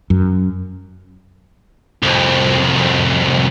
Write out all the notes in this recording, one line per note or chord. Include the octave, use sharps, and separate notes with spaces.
F#2
C2 F2